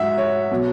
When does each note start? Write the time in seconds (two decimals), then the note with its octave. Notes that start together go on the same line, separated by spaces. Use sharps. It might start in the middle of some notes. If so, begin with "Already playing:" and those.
Already playing: G#2 F#3 E5 F#5
0.18 C#5
0.51 B2 F#3